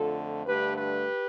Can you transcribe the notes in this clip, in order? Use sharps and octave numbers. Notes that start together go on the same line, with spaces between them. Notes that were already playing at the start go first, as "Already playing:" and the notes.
Already playing: F2 D3 A3 F4 A4
G2 D3 A3 G4 B4
G4 B4